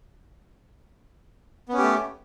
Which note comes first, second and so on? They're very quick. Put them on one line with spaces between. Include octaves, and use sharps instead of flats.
B3 C#4 G4 A3